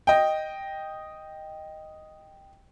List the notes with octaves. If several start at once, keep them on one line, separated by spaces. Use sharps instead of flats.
D#5 G5